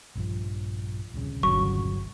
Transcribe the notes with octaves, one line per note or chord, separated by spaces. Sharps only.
A#1 G2 F3
D#1 C2 C#3
G1 F#3 C#6